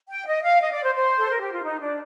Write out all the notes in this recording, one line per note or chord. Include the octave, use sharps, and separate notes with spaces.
G5
D#5
F5
D#5
D5
C5
C5
A4
A#4
G4
F4
D#4
D4